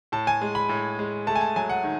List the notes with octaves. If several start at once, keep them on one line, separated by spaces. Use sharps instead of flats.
A2 A5
G#5
G#3
B5
A2
G#3
A3 A5
G#5
A5
F#3 G#5
F#5
D#3